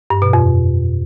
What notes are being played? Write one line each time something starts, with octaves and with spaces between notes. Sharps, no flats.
G2
B2
F2